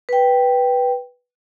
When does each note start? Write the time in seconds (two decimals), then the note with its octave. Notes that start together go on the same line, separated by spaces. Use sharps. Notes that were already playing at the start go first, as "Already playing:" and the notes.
0.09 B4 G5